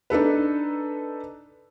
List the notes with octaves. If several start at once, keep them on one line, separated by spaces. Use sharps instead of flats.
D4 D#4 A4 B4